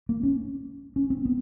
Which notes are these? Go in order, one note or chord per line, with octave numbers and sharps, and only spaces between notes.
A#3
C#4
C#4
C4
B3